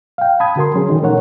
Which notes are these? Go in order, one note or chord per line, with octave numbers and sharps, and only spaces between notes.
F5 G5
A5 B5 D#6 G#6
D3 F#4 A#4 C6
F#3 C#4 G#4
D#3 E3 D#4
B2 A3 C#4 A#4 C#5 F#5